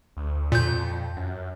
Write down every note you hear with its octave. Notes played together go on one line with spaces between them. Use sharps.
D2
F2 A#2 G6
F#2